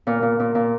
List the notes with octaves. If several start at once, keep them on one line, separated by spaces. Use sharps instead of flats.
A#2 A#4
A#2
A#2
A#2